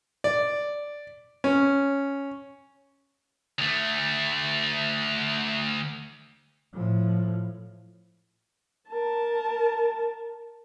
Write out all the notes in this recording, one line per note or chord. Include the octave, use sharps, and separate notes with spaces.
D5
C#4
D2 A3
A2 F3
A#4 A5